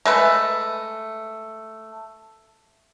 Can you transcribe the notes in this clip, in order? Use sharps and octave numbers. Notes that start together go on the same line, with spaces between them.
G#3 A3 B4